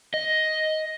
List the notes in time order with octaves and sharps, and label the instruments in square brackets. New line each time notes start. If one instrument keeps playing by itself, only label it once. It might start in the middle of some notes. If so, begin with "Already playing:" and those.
[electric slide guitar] D#5